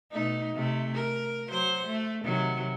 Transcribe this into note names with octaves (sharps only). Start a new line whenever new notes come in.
B2 A3 D#4
C3 A3
A#4
F#3 C5
A3
C3 D#3 F#3